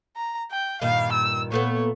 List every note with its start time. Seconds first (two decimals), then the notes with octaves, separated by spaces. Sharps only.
0.16 A#5
0.51 G5
0.82 G2 A#2 D#3 F5
1.12 E6
1.52 A#2 A3 B3 C#5